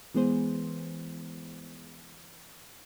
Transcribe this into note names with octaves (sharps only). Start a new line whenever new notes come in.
E3 G#3 B3 G#4 C5